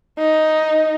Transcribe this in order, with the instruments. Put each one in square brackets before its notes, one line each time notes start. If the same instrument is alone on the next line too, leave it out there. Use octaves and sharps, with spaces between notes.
[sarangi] D#4